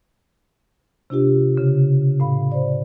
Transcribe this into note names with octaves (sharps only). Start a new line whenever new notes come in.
C3 D4 F4 G4
C#3
A2 F5 B5
C5 D5